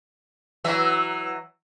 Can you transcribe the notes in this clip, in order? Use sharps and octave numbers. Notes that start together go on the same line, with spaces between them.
E3 F#3 E5